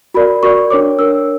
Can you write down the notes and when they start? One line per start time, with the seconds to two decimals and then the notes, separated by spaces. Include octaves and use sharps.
0.14 F#4 A#4 D5 B5
0.43 F#4 A#4 D5 C#6
0.70 D4 A#4 C#5 D6
0.99 D4 A#4 C#5 E6